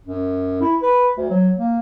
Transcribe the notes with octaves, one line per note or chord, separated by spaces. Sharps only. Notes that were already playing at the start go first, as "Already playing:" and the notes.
F#2
E4
B4
D2
F#3
A#3